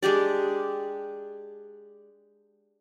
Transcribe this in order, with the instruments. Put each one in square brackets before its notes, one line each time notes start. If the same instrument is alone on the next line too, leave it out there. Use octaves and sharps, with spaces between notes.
[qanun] G#3 D4 G4 D5